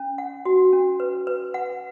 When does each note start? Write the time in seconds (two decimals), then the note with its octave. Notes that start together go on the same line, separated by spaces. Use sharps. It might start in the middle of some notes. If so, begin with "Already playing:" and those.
Already playing: C#4
0.18 F#5
0.45 F#4
0.73 C#4
1.00 B4
1.27 B4
1.54 F#5